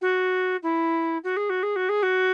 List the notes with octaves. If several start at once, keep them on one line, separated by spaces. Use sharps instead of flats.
F#4
E4
F#4
G#4
F#4
G#4
F#4
G#4
F#4